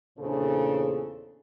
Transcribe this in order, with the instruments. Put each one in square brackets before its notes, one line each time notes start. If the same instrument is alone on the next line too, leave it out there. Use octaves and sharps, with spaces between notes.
[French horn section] E2 A#2 C#3 D4 A4 C5